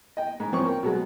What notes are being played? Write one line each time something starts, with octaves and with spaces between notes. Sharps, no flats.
D#5 G5
G#2
F3 C4 C#4 C#6
A#4 G5
B2 F#3 G#3 B3